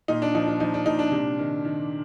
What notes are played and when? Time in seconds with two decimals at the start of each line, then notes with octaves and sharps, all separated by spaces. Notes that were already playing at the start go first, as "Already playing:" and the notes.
0.08 A#2 D#4
0.22 D4
0.34 F3 D#4
0.47 D4
0.60 F3 D#4
0.74 D4
0.86 A#2 D#4
0.99 D4
1.12 C3
1.39 D#3
1.64 D#3